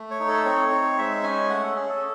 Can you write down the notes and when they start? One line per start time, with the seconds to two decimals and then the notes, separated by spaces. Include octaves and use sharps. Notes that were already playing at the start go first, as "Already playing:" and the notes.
Already playing: A3
0.11 C#5
0.20 D#4
0.28 A4
0.45 C4 C#5
0.72 D#4
0.98 G#3 E5
1.23 C#4 G#5
1.49 A3 F#5
1.63 A4
1.76 C#4 G#4
1.89 A4